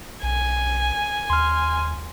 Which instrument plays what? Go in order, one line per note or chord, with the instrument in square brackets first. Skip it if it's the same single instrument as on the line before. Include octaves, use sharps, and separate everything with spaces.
[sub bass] B1 [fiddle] G#5
[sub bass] D#2 [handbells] C6 F6